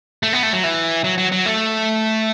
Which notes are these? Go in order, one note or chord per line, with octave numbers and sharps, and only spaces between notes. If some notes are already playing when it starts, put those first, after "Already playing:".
A3
B3
A3
F#3
E3
F#3
F#3
F#3
A3